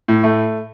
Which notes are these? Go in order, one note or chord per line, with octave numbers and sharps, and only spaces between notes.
A2
A3